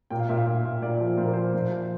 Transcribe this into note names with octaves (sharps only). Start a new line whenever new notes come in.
A#2 G5
F5
A#2 E5
F5
A#2
A#2
A#2 D5
F3
A#2 C5
A#4
F3 C5
A#2 C5
F3